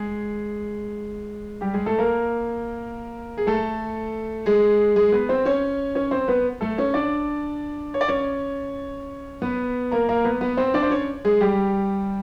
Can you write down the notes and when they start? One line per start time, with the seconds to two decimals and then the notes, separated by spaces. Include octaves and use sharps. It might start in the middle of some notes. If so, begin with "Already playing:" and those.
Already playing: G#3 G#4
1.61 G3 G4
1.74 G#3 G#4
1.86 A3 A4
1.99 A#3 A#4
3.38 G#4
3.47 A3 A4
4.46 G#3 G#4
4.96 G#3 G#4
5.12 B3 B4
5.29 C4 C5
5.45 C#4 C#5
5.95 C#4 C#5
6.11 C4 C5
6.28 B3 B4
6.61 A3 A4
6.78 C#4 C#5
6.94 D4 D5
7.94 C#5
8.01 D5
8.08 C#4 C#5
9.42 B3 B4
9.92 A#3 A#4
10.09 A#3 A#4
10.24 B3 B4
10.41 B3 B4
10.57 C4 C5
10.74 D4 D5
10.83 C5
10.90 C#4 C#5
11.25 G#3 G#4
11.41 G3 G4